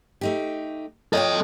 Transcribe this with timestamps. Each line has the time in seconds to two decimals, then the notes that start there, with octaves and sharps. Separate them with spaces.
0.21 A3 D#4 G4
1.13 F4 A4 C#5 D#5 G5